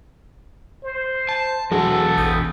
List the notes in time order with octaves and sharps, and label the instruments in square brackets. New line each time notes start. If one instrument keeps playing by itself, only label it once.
[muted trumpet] C5
[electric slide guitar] A5
[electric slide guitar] E2 F#4 [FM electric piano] F#3 G#4 [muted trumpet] A4
[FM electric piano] A1 D#6 G6